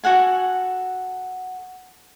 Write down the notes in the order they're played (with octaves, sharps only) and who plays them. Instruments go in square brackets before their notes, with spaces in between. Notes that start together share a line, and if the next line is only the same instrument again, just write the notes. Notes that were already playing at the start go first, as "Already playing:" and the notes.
[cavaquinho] F#4 A4 F#5 G#5